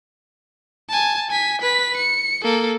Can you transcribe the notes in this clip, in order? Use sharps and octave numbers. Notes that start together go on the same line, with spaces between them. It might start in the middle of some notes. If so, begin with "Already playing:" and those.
G#5 A5
G#5 B6
B4 B6
C#7
A#3 A4